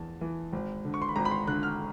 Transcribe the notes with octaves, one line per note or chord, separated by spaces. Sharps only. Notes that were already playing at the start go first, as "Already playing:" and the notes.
Already playing: E2 A5
E3
G#1
D3
C#6
C6
B5
G#1 A#5
B5
C6
D3 F#6
F6